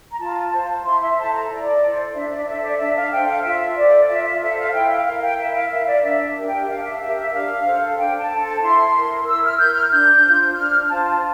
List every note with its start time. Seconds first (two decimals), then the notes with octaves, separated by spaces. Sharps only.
0.12 A#5
0.19 F4 A5
0.53 C5
0.84 E4 C6
1.01 E5
1.18 A4 C5 A5
1.33 A#5
1.49 E4 D5
1.81 A4 C5
2.14 D4 E5
2.30 D5
2.46 A4 C5 E5
2.63 D5
2.78 D4 E5
2.96 F5
3.11 A4 C5 G5
3.27 F5
3.43 F4 E5
3.76 A4 C5 D5
4.09 F4 E5
4.25 E5
4.41 A4 C5 E5
4.57 F5
4.73 E4 G5
4.90 F5
5.05 A#4 F5
5.22 G5
5.37 E4 E5
5.54 F5
5.70 A#4 E5
5.87 D5
6.03 D4 E5
6.36 G4 A#4
6.46 G5
6.64 E5
6.67 D4 F5
6.84 E5
7.00 G4 A#4 E5
7.16 E5
7.32 D4 F5
7.65 A4 C5
7.97 D4 G5
8.19 A5
8.30 A4 C5
8.41 A5
8.62 E4 C6
8.94 A#4
9.27 E4 E6
9.43 F6
9.59 A#4 G6
9.75 F6
9.92 D4 G6
10.23 F4 C5
10.56 D4 F6
10.89 F4 C5 A5